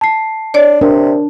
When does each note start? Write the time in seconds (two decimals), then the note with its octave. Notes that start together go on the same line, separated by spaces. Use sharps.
0.01 A5 C7
0.54 D4 C#5 D5
0.81 C3 D4 A#4